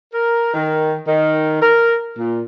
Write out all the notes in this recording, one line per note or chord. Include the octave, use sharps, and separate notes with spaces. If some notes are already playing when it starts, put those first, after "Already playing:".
A#4
D#3
D#3
A#4
A#2